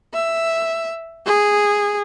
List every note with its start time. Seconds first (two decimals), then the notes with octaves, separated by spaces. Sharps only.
0.13 E5
1.26 G#4